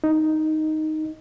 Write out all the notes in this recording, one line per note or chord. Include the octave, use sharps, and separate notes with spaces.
D#4